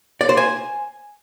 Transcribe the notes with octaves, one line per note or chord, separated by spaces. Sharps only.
D5
C5
G#5